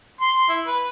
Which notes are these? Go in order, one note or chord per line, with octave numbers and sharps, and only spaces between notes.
C6
E4
B4